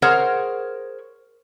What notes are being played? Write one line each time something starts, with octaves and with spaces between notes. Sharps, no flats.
G#4 A#4 C5 C#5 F#5